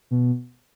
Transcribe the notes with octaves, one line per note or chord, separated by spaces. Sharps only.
B2